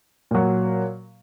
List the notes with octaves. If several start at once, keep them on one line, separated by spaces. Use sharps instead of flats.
A#2 F#3